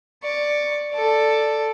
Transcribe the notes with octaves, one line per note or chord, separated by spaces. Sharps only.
D5 C#6
A4 D5